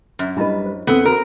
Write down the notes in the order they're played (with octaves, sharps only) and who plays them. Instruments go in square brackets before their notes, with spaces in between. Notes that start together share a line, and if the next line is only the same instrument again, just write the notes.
[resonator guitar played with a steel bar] F#2
[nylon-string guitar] G3 B4 [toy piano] D4 E4 D#5
[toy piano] C5
[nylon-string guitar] E2 C4 [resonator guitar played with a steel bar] B3 [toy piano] D#4 A4 E6
[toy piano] F#4 C5 [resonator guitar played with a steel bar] A#4